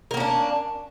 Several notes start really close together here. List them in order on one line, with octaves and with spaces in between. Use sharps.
A#4 A#3 C#4 D4